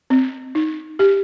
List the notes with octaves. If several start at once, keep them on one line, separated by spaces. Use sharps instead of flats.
C4
D#4
G4